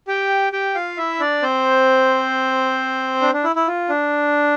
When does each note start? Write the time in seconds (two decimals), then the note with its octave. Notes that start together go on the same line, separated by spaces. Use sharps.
0.08 G4 G5
0.53 G4 G5
0.75 F4 F5
0.97 E4 E5
1.20 D4 D5
1.42 C4 C5
3.21 D4
3.33 D4
3.44 E4
3.56 E4
3.67 F4
3.89 D4